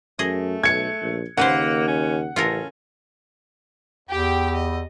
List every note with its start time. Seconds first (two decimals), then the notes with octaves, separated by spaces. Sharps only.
0.19 F#2 A3 G#4 D#5
0.64 B1 G#6 C#7
1.02 A#1
1.37 D#2 C#3 A#3 B4 C5 F#5
1.88 C#4
2.36 A1 C#4 F4 A4 A#4
4.09 E2 G4 G5
4.55 D#5